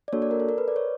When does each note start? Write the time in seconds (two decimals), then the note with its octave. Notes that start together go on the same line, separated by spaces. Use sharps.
0.08 D5
0.13 A#3 D4 F#4 A4 C#5
0.22 D5
0.31 A#4
0.40 A4
0.49 A#4
0.58 B4
0.68 D5
0.76 C#5